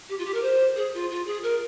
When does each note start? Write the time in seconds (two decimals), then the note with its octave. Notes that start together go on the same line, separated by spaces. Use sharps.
0.09 G4
0.19 F4
0.26 G4
0.34 A#4
0.43 C5
0.77 G#4
0.94 F4
1.11 F4
1.27 G#4
1.43 A#4